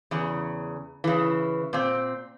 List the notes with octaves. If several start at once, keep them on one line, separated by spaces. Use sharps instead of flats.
E2 C#3
C#3 E3
A#2 C4